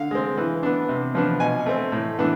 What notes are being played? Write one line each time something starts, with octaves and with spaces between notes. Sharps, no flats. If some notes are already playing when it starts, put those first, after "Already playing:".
Already playing: D3 F5
G#3 C4
E3
B3 D4
C3
F3 B3 D4
B2 G#5
A3 C4
A2
E3 B3 D4